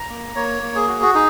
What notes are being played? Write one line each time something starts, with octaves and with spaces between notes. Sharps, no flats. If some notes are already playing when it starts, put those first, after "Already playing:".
Already playing: A#5
A#3
A#3 C#5
A#3
G#4
F#4
F#4
D#4 G#4